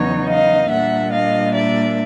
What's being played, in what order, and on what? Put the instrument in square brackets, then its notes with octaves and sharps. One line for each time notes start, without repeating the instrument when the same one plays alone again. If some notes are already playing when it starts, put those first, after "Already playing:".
Already playing: [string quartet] E2 C#3 F#3 B3 D#4 C#5
D#5 F5
A#2 G3 A#3 D4 E5 F#5
D#5 F5
D5 E5